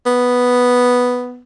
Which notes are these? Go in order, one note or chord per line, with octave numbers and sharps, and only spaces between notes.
B3